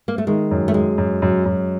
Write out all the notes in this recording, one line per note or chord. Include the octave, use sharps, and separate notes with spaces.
A#3
A3
D#3 G#3
F#2
A3
F#2 G#3
F#2
F#2
F#2